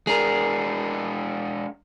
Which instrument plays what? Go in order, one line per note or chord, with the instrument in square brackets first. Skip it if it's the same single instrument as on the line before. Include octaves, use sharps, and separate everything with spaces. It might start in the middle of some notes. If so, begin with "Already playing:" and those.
[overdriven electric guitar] G#3 D4 [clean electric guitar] G#4 A#4